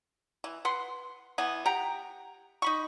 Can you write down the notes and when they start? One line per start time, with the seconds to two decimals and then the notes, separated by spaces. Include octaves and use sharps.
0.44 E3
0.65 B4 F#5 C6
1.38 E3 B3 G#5
1.66 G4 F#5 G5 A#5
2.62 D#4 B5 C#6